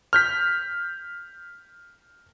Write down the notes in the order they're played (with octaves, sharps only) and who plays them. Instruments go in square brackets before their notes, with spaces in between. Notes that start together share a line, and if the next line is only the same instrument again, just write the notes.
[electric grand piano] F6 G6 B6